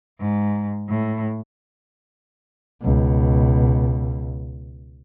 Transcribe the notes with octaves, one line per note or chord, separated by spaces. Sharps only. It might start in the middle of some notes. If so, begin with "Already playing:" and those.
G#2
A2
C#2 B2